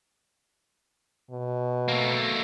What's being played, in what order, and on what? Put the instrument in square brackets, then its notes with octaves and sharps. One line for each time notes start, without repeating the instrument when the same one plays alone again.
[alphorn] B2
[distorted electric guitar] A3 A#3